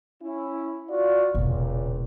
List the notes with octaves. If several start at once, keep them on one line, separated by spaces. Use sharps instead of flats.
C#4 E4
F4 F#4 D5
E1 C#2 A#2